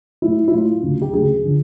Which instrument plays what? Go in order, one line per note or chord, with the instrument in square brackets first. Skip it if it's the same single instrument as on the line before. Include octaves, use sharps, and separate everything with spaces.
[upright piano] A2 F#3 E4
E4
A2 F#3 F4
D2 C#3 F#3
G4
D2 C#3 F#3 G#4
D3 F3